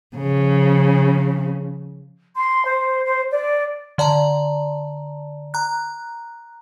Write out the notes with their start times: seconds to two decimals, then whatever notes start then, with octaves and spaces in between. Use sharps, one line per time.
0.16 C#3 F3
2.36 C6
2.65 C5
3.05 C5
3.31 D5
3.98 D3 D5 A5 A#5
5.54 A#5 F#6